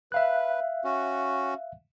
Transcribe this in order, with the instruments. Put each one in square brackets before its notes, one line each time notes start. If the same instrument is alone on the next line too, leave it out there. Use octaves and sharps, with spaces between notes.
[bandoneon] B4 [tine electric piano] E5 F5 F#6
[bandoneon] C#4 F#4